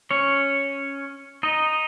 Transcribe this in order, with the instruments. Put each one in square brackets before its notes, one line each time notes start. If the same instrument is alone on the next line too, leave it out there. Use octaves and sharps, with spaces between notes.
[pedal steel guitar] C#4 C#5
D#4 D#5